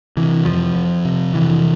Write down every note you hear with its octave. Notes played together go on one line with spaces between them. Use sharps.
C3 E3
F2 F3
F2
C3
C3 E3